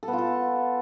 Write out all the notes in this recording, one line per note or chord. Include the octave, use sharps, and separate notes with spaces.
A4
B3
F4
A4